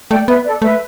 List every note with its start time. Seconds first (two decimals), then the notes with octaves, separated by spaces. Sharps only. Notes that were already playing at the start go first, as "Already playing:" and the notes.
0.11 A3 D5 G5
0.28 B3 B4 E5
0.45 A4 D5
0.62 A3 B4 E5